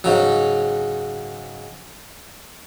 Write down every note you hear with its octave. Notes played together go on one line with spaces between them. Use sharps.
G#2 C#3 F#3